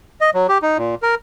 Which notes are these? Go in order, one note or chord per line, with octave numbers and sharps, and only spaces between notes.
D#5
F#3
G4
D#4
A#2
A#4